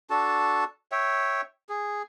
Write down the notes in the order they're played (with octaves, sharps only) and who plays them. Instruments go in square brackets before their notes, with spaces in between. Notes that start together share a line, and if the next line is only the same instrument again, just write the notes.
[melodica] D4 F#4 A4 A5
C#5 E5 G5
G#4